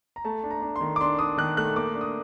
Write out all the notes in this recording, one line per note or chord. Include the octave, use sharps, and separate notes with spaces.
A#5
A3 A5
D4
A#5
D4
C6
D#3
D6
D4 C6
D4 D#6
D#3 F#6
A3 F#6
A#3 D6
D4
D#6